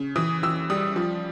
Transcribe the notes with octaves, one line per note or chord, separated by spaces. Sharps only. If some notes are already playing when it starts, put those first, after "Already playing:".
Already playing: C#3
E3 D#6
E3 E6
G3 D#6
F3